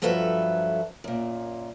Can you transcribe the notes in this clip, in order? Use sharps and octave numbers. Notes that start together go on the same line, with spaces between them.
G2 F3 F#3 A4 B4 E5
F#2 A#2